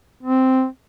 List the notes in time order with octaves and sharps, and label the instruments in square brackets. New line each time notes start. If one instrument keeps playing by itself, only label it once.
[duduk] C4